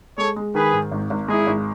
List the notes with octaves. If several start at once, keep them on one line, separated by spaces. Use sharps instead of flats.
G#3 A4 C#5
G#3
D#3 G#4 B4
G#2
G#1
G#1
G#3 E4 G#4
G#1